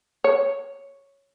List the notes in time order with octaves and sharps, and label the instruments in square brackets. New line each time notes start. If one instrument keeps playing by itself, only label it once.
[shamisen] C#5